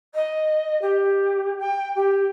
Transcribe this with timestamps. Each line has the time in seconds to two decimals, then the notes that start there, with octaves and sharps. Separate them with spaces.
0.14 D#5
0.81 G4
1.58 G5
1.95 G4